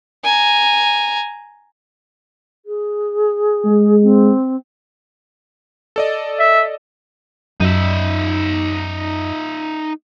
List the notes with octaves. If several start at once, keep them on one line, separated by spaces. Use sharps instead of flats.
G#5 A#5
G#4
G#3
C4
A4 D5 D#5
E5
F#2 D#4 E5